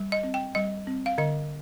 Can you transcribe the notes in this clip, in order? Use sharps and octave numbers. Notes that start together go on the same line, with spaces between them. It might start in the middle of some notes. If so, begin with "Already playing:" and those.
Already playing: G3
D#5
C4
G5
G3 D#5
C4
F5
D3 D#5